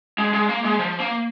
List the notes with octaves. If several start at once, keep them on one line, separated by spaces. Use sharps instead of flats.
G#3
G#3
A#3
G#3
F3
A#3